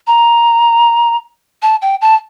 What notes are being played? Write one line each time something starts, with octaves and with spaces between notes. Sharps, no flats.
A#5
A5
G5
A5